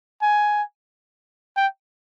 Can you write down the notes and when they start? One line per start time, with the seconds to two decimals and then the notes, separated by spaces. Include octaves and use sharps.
0.22 G#5
1.57 G5